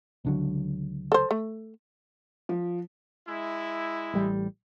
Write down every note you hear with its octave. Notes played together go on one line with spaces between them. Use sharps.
C#2 D3 F#3
A4 C5
A3
F3
G#3 E4
A1 G3